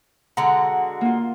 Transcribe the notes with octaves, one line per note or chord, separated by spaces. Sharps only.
D3 G#3 F#4 A#5
A#3 F4